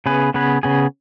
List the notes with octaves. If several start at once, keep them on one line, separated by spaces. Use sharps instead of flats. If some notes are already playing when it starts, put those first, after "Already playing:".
C#3 B3 G#4 B4
C#3 B3 G#4 B4
C#3 B3 G#4